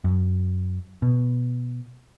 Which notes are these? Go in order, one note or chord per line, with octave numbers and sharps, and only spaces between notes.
F#2
B2